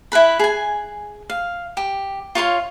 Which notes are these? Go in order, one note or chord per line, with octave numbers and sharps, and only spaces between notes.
E4 A#4 B4 B5
G#4 G#5
F5
G4
F4 C#5 F5 C6